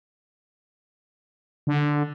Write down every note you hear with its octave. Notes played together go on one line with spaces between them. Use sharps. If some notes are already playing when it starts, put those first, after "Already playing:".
D3